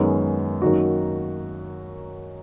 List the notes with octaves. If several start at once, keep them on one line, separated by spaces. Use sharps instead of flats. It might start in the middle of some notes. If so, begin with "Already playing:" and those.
Already playing: F#2 D#3 G#3 B3 D#4
F#2 D#3 A#3 D#4 F#4